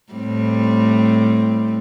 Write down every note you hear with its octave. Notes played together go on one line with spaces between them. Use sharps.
A2 G3 C4